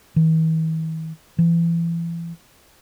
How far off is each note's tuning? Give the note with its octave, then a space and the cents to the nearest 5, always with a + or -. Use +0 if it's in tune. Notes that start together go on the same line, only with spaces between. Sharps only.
E3 -45
E3 +35